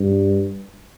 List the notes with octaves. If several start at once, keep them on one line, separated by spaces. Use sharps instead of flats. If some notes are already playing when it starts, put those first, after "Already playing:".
Already playing: G2